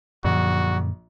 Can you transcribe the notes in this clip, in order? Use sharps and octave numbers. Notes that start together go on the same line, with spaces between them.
A#1 F#2 A#2 D3 F#4